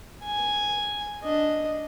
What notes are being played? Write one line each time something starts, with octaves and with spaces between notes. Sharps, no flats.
G#5
D4 D#5